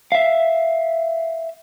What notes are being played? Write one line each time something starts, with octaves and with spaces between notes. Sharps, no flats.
E5 F5